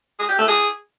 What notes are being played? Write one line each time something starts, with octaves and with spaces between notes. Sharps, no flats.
G#4
G4
A3
G#4